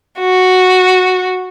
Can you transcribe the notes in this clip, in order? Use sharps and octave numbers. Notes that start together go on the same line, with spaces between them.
F#4